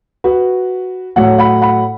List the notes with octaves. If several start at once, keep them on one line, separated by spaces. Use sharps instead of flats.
F#4 B4
A2 F#3 A3 C#5 F#5
F#5 B5
F#5 B5